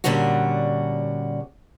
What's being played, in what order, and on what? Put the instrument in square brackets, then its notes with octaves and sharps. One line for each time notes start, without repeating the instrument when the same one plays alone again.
[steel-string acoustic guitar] A#2 D3 G3 C#4 D4 F#4